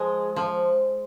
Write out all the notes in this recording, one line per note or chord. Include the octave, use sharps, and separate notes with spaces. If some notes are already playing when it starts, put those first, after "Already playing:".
Already playing: F3 G#3
F3